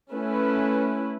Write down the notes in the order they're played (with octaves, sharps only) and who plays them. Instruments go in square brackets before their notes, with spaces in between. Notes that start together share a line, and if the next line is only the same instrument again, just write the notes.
[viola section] A3 C#4 E4 B4